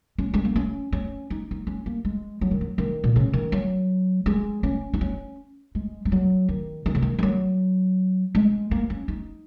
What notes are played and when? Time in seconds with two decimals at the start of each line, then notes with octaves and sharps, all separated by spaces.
0.18 C#4
0.34 G#3
0.45 A#3
0.56 C#4
0.92 C#4
1.30 D#4
1.51 D#4
1.67 C#4
1.86 A#3
2.05 G#3
2.41 F#3
2.51 D#3
2.61 F#3
2.78 D#3
3.04 A#2
3.16 C#3
3.33 D#3
3.52 F#3
4.26 G#3
4.63 C#4
4.94 D#4
5.01 C#4
5.75 G#3
6.05 G#3
6.12 F#3
6.49 D#3
6.86 D#3
6.95 C#3
7.02 D#3
7.19 D#3
7.23 F#3
8.35 G#3
8.71 A#3
8.90 C#4
9.08 D#4